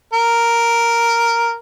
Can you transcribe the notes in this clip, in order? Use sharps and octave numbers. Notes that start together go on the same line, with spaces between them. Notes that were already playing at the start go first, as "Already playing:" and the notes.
A#4